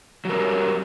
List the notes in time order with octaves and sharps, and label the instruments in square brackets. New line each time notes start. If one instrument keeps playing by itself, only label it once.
[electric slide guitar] F#3 G3 A#4